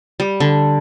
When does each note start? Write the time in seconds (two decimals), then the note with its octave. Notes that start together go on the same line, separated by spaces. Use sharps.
0.20 G3
0.40 D3